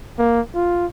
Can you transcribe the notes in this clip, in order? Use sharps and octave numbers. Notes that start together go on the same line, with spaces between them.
A#3
F4